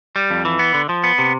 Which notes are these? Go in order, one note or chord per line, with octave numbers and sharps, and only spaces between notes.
G3
F2
E3
B3
D3
F3
B3
C3